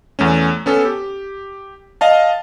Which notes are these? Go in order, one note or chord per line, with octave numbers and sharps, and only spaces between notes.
E2 A3 C#4
B3 C#4 A4
G4
D#5 F5 A5